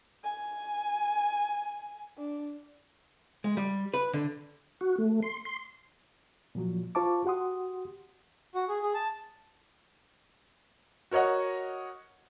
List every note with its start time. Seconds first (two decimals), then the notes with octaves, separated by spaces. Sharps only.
0.24 G#5
2.18 D4
3.44 G#3
3.57 G3
3.94 B4
4.13 D3
4.81 F#4
4.98 A3
5.22 C6
5.45 C6
6.55 A#2 F3 F#3
6.95 F4 C5 F5 A5 C#6 D6
7.25 F#4 G4 F#5 C6 D#6
8.55 F#4
8.69 G#4
8.83 G#4
8.94 A5
11.11 F#4 A#4 C#5 D#5 F#5